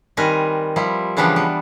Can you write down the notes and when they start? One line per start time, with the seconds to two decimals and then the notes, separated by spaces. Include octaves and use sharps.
0.17 D#3 G3 C4 A#4 B4 G#5
0.76 F3 G3 E4
1.17 C#3 E3 F3 G3 B3 D4
1.36 B3